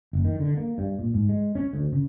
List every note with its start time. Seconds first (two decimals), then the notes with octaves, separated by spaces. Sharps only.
0.13 F#1
0.25 D#3
0.40 D3
0.57 A#3
0.78 G2
0.99 A#2
1.14 G#2
1.29 G#3
1.55 C#4
1.73 D2
1.93 C#3